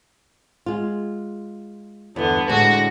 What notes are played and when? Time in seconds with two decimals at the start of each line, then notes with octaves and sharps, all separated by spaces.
0.66 G#3 F4
2.16 E2 G2 D3 B3
2.49 A2 D3 G#3 F#4 A#6